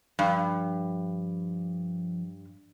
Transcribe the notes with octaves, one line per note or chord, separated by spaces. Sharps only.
G2 F3